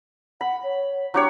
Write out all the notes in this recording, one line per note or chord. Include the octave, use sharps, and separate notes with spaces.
F#5 B5
C#5
F#3 D4 G4 C#5